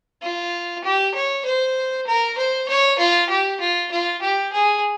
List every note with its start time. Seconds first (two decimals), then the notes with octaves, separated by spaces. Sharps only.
0.22 F4
0.84 G4
1.14 C#5
1.45 C5
2.07 A#4
2.37 C5
2.68 C#5
2.99 F4
3.29 G4
3.60 F4
3.91 F4
4.22 G4
4.52 G#4